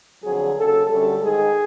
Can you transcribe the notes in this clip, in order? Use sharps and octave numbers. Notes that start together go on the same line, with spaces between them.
F2 D3 F#3 G#4
D#2 C#3 F#3 A4
F#2 D3 G3 A4
G#2 D#3 G#3 G#4